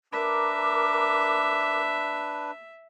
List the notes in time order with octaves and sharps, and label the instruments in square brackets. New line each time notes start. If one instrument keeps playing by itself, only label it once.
[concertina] D4 B4 [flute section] A#4 D6 [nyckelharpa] E5